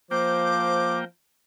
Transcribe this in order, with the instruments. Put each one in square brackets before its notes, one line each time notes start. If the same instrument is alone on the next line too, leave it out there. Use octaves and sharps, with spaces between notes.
[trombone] F3 [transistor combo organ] A#3 G5 [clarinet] C5 [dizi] D6